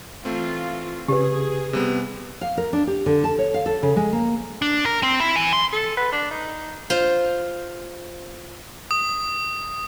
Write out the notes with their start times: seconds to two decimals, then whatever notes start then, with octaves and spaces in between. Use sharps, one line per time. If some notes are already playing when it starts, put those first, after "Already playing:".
0.25 E3 A3 C4 F4
1.08 C#3 G4 G#4 B4
1.73 C3 G3 B3
2.41 F5
2.57 A#4
2.73 D4
2.87 G4
3.06 D3
3.24 A5
3.39 C#5
3.54 F5
3.66 A4
3.83 C#3
3.96 G#3
4.13 A#3
4.62 D4
4.85 A#4
5.03 C4
5.20 E4
5.36 E3
5.53 C6
5.72 A4
5.97 B4
6.12 D4
6.31 D#4
6.90 F4 C5
8.91 D#6